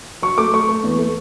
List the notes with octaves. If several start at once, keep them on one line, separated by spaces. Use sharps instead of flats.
F#3 C#6
A3 D6
A3 C#6
A3
E2
A3